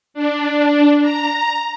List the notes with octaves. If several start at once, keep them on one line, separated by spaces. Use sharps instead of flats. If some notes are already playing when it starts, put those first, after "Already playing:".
D4
A#5